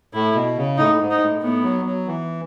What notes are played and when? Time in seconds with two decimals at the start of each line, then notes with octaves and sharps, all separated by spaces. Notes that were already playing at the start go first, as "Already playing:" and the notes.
0.13 A2 E4
0.35 B2
0.57 C#3
0.78 A2 D#4
0.94 A2
1.00 G#2
1.10 D#4
1.21 A2
1.42 A2 B3
1.63 F#3
1.85 F#3
2.07 E3